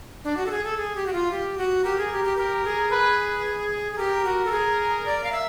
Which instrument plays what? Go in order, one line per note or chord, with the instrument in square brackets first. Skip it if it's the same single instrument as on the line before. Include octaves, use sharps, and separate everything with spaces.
[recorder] D4
F#4
A4
G#4
A4
G#4
G4
F#4
F4
G4
F#4
[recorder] G4 [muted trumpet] A#4
[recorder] G#4
G4
G4
[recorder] G4 [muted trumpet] A#4
[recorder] G#4
[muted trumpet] B4
[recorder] G#4
[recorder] G4 [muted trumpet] A#4
[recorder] F#4
A4
G#4
D5
F5
E5